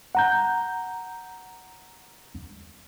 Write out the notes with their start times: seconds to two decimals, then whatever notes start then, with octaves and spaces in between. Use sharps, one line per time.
0.15 F#5 A#5 G6